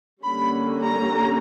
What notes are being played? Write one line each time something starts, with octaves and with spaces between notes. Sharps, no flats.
D3 G3 A#3 C#4 B5
A#5